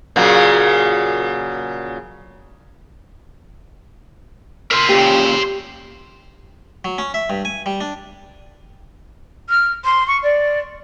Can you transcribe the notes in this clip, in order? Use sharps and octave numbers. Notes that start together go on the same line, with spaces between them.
A#2 C#3 F#3
A#4 C5 E5 C6
A#2 C#3 G4
F#3
C#4
E5
G2
G#5
G3
D4
F6
C6
C#6
D5